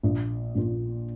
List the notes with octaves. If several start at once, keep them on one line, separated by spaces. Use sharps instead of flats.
A#1 A#2 A#3
A#1 A#2 A#3